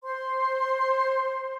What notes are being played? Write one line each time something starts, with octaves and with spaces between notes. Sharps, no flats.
C5 C6